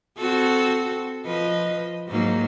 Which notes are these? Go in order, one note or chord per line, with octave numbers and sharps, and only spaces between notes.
C4 F#4 A4
F3 B4 D#5
G#2 F#3 A#3